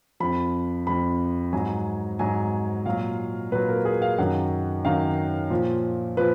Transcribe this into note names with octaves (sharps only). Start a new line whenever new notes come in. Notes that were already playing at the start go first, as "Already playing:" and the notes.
F2 F3 B5
F2 F3 B5
G#2 F#3 G#5
G#2 F#3 G#5
A#2 F#3 F5
A#2 F#3 B4
A#4
G#4
F5
F#2 D#3 F#3 F#5
F#2 D#3 F#3 F5
A#2 F3
A#2 F3 B4